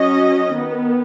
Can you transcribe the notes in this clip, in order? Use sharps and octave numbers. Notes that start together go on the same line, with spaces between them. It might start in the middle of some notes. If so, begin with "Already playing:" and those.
Already playing: F#3 C#4 D#5
D#3 B3